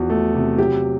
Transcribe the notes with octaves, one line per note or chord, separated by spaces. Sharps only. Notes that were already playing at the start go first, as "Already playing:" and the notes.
Already playing: E2 F3 F#4
A3
C3
F#3 G4